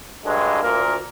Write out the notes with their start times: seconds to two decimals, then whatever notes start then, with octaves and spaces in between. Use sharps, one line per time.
0.25 G2 D3 F#3 G#3
0.62 D2 A#2 A#3 A#4